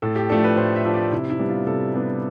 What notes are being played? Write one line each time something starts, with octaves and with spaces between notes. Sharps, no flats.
A2 A4
G4
F3 A3 D4 A4
B4
A2 C5
E5
F3 A3 D4
D5
C3 E4
E4
G3 B3 D4
F4
C3 A4
G3 B3 D4